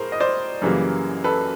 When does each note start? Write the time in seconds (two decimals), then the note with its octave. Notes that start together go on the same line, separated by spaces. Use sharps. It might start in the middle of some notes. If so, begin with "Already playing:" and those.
Already playing: A2 G#4 A#4 C5
0.12 D#5
0.20 C5 D5
0.62 F#2 C#3 E3 G3 A#3
1.24 A4 B4